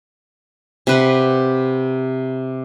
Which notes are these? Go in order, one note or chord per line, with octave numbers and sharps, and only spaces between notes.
C3 B4 F#5